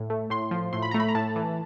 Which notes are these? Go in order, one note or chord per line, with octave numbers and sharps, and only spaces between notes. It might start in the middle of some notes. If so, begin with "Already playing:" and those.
Already playing: A2
A3
A2 C6
F3
A2 C6
B5
A3 A#5
B5
A#5
A2 A5
E3